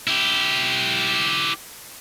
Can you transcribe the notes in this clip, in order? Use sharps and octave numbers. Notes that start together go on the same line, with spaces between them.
E4 G4